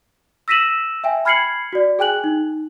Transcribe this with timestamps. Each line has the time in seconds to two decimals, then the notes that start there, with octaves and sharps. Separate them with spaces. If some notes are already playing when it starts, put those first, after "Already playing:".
0.48 E6 A#6 B6 D#7 E7 F#7
1.04 E5 G5 G#5
1.25 B5 F6 G#6 C7 C#7 F#7
1.73 F#4 D5
1.99 G#4 G5 G#5 F#6 F#7
2.24 D#4